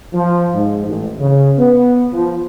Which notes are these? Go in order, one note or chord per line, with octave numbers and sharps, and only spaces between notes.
F3
G#2
A1
C#3
B3
F3